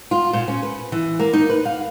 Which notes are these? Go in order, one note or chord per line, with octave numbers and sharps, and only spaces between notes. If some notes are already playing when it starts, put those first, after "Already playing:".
F4
A#2
C#4
B4
E3
A#3
D#4
B4
F5